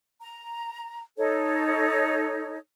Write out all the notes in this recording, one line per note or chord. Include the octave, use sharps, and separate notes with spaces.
A#5
D#4 A4 C#5